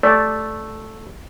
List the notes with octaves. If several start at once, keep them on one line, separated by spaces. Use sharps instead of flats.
A3 D5